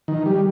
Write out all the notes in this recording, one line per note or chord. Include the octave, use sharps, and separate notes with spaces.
D#3
G3